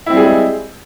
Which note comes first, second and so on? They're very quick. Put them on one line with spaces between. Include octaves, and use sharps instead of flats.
E4 C4 G3 G#4 G#3